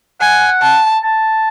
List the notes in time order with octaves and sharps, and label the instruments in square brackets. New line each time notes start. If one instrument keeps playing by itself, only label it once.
[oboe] F#5 [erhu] G#5
[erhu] A5
[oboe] A5